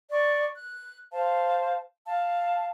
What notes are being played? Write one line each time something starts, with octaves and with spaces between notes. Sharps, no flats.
D5 C#6
F#6
C5 F5 A5
F5 A5